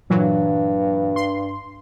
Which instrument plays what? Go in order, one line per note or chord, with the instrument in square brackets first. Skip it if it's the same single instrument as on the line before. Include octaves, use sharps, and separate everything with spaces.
[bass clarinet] G2 [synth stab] A#2 E3 F#3
[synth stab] C6